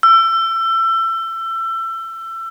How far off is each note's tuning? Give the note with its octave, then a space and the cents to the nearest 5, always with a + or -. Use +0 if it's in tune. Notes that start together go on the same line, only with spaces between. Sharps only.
E6 +25